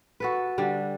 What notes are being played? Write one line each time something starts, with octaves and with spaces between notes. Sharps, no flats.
F#4 A4 B4
D3 G3 D4